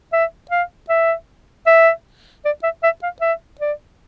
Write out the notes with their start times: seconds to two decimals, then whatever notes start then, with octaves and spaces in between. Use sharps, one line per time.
0.13 E5
0.51 F5
0.89 E5
1.67 E5
2.45 D5
2.63 E5
2.83 E5
3.03 F5
3.21 E5
3.61 D5